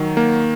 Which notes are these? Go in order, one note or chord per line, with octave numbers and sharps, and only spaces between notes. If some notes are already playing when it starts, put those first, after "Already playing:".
Already playing: D#3 F#3
A#3